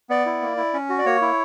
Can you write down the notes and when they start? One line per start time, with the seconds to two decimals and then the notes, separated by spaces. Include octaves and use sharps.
0.10 B3 D5
0.26 E4
0.42 A#3
0.57 E4
0.74 C#4
0.89 F#4
0.99 D5
1.06 A#3 C#5
1.21 E4